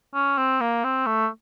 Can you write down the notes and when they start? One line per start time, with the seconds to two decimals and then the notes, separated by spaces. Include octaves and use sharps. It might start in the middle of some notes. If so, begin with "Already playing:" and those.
0.14 C#4
0.38 C4
0.61 A#3
0.84 C4
1.06 A3